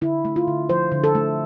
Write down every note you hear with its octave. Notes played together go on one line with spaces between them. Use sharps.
D3 E4
A3
F4
D3
F3 C5
D3
A4
A3